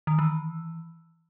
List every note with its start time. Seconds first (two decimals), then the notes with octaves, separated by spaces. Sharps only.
0.07 D#3
0.19 E3